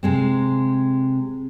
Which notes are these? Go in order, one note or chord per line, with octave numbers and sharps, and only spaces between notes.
C3 G#3 C4